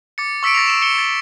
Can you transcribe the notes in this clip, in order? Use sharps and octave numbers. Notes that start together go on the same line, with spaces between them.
D6 A6 C#7
C#6 E6 B6 C#7 D7
A6 A#6 C7 F7
E6 E7
C#7 G7
A6 D7